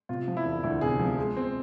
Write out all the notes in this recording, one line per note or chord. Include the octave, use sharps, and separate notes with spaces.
C3 F4
F3
E4
E1
D2 E4
C3 G#4
F3
G#3
C4